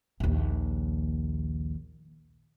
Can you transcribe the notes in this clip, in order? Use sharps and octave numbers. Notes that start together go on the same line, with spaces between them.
A#1 D#2